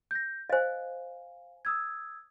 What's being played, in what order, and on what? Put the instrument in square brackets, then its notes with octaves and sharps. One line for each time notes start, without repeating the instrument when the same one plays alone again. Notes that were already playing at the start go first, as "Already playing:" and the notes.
[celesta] G6 A#6
[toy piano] C5 D#5 [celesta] F5 G#5
[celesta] D#6 E6 G#6